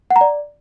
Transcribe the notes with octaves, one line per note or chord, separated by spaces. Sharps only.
F#5
A#5
D5